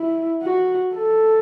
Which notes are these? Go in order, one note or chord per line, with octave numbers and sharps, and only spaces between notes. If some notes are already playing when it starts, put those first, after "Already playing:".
Already playing: E4
F#4
A4